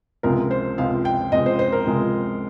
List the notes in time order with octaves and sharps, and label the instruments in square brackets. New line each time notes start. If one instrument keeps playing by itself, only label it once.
[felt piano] C#2 C3 F3 G#3 A#4
C5
C#2 C3 F3 G#3 F5
G5
C#2 C3 F3 G#3 D#5
C5
C5
A#4
C#2 C3 F3 G#3